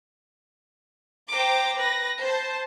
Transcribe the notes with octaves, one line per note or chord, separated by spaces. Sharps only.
C5 G5 A#5 D6
B4 A#6
C5 A5